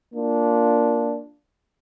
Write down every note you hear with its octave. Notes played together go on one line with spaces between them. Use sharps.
A#3 D4 F4